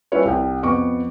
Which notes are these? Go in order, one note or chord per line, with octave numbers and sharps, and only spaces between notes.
G3 C#4 E4 F4 B4 C#5
C2 G5
F2 B3 C#6 D6